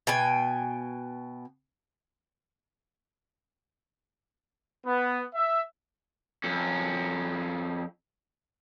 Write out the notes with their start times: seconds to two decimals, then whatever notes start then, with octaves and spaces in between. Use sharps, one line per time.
0.07 B2 G5 G#5
4.86 B3
5.34 E5
6.44 F2 C#4